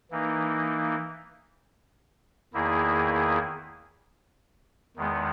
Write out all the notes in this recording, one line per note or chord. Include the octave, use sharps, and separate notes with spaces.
E3 A#3 D#4
E2 D#3 A#3 E4 G#4
E2 D#3 G#3 B3